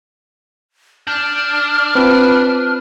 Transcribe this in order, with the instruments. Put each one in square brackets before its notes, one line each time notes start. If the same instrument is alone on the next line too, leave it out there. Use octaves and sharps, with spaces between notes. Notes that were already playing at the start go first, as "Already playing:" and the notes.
[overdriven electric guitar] D4 [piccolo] F6 [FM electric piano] G6
[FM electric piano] C4 F4 [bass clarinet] B4